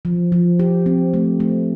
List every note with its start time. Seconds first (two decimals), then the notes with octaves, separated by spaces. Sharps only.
0.05 F3
0.32 F3
0.59 G4
0.86 C4
1.14 A3
1.40 A3